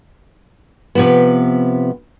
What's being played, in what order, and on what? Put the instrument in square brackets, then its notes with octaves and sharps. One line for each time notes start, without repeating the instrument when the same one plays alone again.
[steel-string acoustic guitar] C3 F3 B3